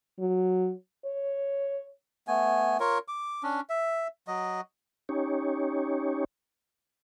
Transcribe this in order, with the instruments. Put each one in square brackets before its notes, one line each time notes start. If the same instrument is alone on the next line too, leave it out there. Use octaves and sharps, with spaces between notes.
[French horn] F#3
C#5
[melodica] A3 B3 G#5
F4 A#4 C#5
D6
C#4 D4
E5
F#3 D#5
[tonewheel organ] C#4 D#4 G4 C#5